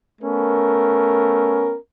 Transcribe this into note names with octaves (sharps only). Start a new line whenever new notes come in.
A3 B3 C#4 A#4